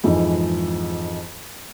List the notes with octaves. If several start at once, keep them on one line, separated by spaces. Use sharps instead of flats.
F2 G#2 E3 G#3 D#4